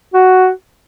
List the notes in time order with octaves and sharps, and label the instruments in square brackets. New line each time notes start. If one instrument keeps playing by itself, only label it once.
[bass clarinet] F#4